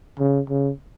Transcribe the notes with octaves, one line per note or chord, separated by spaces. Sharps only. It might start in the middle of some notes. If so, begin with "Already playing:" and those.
C#3
C#3